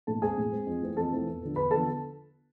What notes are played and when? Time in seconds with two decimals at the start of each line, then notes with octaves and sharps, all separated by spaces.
0.07 A2 A4 A5
0.22 G#3 C4 G#4 G#5
0.38 A2
0.52 G#3 C4
0.67 F2
0.81 E3 A3 C4
0.97 F2 A4 A5
1.12 E3 A3 C4
1.26 E2
1.41 D3 F3 B3
1.56 E2 B4 B5
1.71 D3 F3 B3 A4 A5